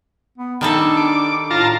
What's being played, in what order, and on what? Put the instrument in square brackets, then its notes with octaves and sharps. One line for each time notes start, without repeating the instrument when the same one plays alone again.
[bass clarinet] B3
[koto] D#3 G3 A4 [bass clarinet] D4
[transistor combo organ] D6
[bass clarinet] A2 [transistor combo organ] F4 A5 A#5